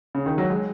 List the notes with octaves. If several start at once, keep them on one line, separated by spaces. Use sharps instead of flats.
C#3
D#3
F#3
G#3